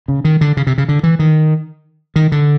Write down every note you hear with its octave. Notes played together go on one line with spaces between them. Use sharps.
C#3
D#3
D3
C#3
C3
C#3
D3
E3
D#3
D#3
D3